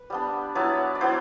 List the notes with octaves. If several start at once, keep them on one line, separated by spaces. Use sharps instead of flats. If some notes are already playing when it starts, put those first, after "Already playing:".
Already playing: B4
G3 B3 D4
F#3 B3 E4 D5
D5
F#3 B3 E4 C5